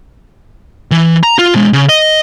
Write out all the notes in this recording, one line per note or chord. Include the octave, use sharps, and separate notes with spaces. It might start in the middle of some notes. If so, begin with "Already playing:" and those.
E3
A#5
F4
B2 G#3
C#3
D#5